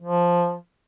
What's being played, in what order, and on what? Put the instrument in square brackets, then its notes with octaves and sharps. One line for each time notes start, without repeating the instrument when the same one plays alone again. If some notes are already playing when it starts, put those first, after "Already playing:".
[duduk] F3